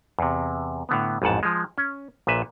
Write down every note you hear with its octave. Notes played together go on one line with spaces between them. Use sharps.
E2 C3
A2 D3 B3
A1 F2 G#2 F#5 A5
F3 G#3
C#4
A#1 A#2 B4 E5